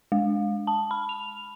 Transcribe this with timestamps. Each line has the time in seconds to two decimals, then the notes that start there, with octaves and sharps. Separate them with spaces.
0.12 G#3
0.67 A5
0.91 B5
1.09 F7